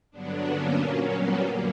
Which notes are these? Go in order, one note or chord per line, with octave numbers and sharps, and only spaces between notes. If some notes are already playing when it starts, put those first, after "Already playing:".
G2 D3 F#3 B3 D4
A#3 C#4
A#2 F#3
G3 B3
F#2 D3 F#3 A#3